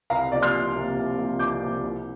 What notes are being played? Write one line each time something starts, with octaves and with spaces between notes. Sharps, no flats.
C2 F5 A#5
C3 F3 A#3 D5
C6 F6
C2
C3 F3 A#3
C2
C3 F3 A#3
C2 D6 G6
C3 F3 A#3
C2